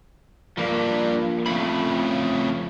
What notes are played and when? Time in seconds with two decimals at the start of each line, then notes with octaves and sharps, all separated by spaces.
0.57 G2 F3 A#3
1.46 F2 A2 C#3 B5